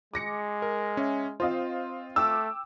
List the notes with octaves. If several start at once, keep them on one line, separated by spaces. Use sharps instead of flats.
G#3 D6 A#6 C#7
A#4
C#4 E5
C4 F4 C5 D#5 F5
A3 G5 D6 E6